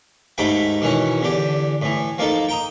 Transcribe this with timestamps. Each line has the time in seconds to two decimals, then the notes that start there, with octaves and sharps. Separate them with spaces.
0.38 D#2 G#2 A3 D#4 G5 B5
0.81 B2 D#3 E3 C#4
1.21 E2 D3 G4
1.82 A2 E3
2.18 F3 A#3 D#4 A4
2.49 G5 A#5 D#6